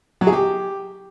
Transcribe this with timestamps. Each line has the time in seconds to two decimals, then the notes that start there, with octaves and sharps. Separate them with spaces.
0.21 F#3
0.27 G#4
0.33 G4